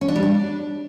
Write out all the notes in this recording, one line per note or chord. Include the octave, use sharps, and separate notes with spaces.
C#4
D4
G3
D4